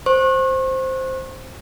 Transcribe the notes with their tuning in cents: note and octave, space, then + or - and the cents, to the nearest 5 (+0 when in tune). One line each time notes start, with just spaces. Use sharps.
C5 +0 C#6 -40